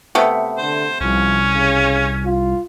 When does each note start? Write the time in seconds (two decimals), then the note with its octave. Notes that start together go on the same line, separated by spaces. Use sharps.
0.15 C3 A3 B3
0.57 D3 C5
1.01 C2 F3 C#4
1.55 C#3
2.25 F4